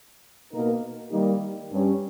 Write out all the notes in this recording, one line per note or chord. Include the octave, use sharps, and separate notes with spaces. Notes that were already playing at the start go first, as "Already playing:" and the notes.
B2 A#3 D#4 A#4
D#3 G3 A#3 D#4 G4
G2 G3 C#4 G4